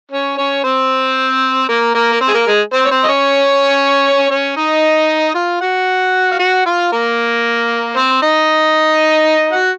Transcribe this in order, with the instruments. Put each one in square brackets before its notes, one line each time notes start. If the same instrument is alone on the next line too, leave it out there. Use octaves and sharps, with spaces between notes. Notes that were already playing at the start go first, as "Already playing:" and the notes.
[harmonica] C#4 C#5
C#4 C#5
C4 C5
A#3 A#4
A#3 A#4
A#4
C4 C5
G#4
A#3 A#4
G#3 G#4
C4 C5
C#5
C4 C5
D#5
C#4 C#5
C#4 C#5
D#4 D#5
F4 F5
F#4 F#5
F5
F#4 F#5
F4 F5
A#3 A#4
C4 C5
D#4 D#5
F#4 F#5